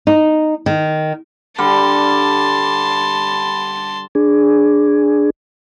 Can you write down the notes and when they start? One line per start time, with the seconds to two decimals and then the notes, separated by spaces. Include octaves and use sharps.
0.07 D#4
0.66 D#3
1.58 D3 G3 A5 B5 C6
4.15 D4 G#4